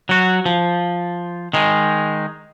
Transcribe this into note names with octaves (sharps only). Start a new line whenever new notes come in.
F#3 F#4
F3
D#3 G#3